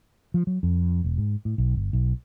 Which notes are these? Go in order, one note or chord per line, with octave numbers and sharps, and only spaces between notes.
F3
F#3
F2
E1
G#2
A2
B1
G1
B1